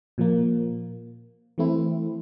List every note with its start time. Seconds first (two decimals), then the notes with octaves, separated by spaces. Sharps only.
0.18 A#2 F3 A#3
1.58 E3 A3 C4 E4